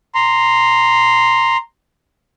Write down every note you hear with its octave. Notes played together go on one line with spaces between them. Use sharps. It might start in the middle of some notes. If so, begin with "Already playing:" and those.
A#5 C6